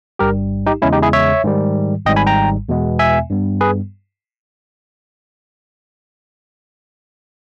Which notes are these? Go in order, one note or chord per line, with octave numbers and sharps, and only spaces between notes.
G1 G2 G3 G4 A#4
D#4 G4
E2 C#3 G#3 C#4 E4
D#4 G4
E4 G#4
C#5 E5
G#2 D#3 G3
G#1 G#2 G3 D#5 G5
G#5 B5
G5 A#5
E2 B2 G#3 B3
E5 G#5
G2 G3 B3
G#4 B4